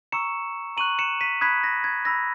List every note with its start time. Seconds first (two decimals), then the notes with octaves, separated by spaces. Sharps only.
0.12 A#5 C#6 E6 C#7 E7
0.77 A#5 C#6 F#6 D#7 F#7
0.99 C#7 E7
1.21 B6 D#7
1.41 B5 D#6 F#6 G#6 B6
1.64 A#6
1.84 G#6
2.05 B5 E6 A#6